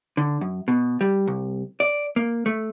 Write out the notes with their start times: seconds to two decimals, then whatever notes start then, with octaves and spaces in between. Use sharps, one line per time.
0.17 D3
0.41 F#2
0.68 B2
1.01 G3
1.27 C2
1.80 D5
2.16 A#3
2.46 A3